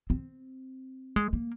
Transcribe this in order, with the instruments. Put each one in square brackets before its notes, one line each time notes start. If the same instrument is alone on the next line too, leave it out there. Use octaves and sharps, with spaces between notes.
[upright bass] C4
G#3
A#3